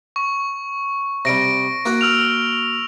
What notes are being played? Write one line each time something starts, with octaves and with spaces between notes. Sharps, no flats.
C#6
C3 G3 A#6 D7
A#3 F#4 F#5
E6 F6 F7